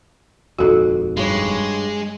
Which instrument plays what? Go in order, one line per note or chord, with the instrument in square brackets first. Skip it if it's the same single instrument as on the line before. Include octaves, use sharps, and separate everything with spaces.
[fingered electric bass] D#1 F2 G#2 [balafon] F#4 A4
[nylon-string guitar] G2 C#5 [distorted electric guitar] G#3